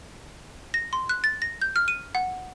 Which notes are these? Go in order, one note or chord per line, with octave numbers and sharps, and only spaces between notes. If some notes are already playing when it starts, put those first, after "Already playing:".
A#6
C6
F#6
A6
A#6
G6
F6
D#7
F#5